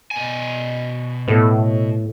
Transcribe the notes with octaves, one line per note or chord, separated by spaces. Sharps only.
B2 G#5
A2 B3 A4